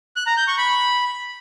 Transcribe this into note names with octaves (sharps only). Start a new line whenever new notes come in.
F#6
A#5
G6
C#6
B5